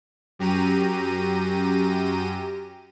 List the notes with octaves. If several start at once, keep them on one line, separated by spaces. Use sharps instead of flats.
F#2 G4 A#5 D#7